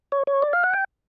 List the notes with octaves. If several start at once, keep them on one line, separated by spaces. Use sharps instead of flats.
C#5
C#5
D5
F5
F#5
G5